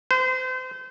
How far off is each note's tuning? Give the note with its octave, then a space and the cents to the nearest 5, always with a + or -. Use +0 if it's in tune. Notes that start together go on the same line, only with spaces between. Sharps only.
C5 -35